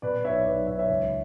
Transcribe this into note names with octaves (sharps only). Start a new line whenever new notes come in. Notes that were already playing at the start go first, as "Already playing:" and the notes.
B2 B4 D5
B1 C#5 E5
B1 B4 D5
B1 C#5 E5
C#5 E5
C#2